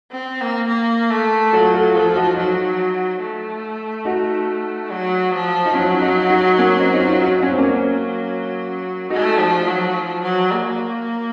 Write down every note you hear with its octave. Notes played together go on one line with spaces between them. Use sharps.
C4
A#3
A#3
A3
F#3 F4 A4
F4 A4
F3 F4 A4
F4
D#4 F#4
F#3 D#4 F#4
A3
D#4 F#4
F#3
F3
D#4
F#3 C#4 F4
D#4 F#4
D#4 F#4
A#3 C#4
C4 D#4
D#4
C#4 F4
D#4 F#4
F#3 C#4
C4
A#3 C#4
A3 D#4 F#4
F3
F#3
F3
F#3
A#3